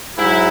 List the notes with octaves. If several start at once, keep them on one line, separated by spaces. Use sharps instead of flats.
G#2 F#3 E4